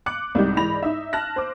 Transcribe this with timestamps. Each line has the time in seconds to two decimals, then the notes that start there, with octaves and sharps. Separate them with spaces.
0.06 D6 F#6 C#7
0.35 C2 G#2 G3 D#4 G4 G6
0.57 G#2 E3 D5 B5 A#6 F7
0.83 D#4 E5
1.13 A5 F6 F#6 A#6
1.36 C5 D6